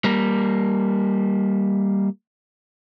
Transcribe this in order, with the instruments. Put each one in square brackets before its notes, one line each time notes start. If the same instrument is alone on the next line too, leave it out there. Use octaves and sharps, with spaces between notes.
[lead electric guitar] G3 A#3